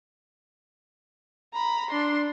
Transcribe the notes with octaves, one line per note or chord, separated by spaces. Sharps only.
A#5 B5
D4 C6